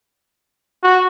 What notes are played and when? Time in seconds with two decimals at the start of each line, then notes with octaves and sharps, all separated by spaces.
0.83 F#4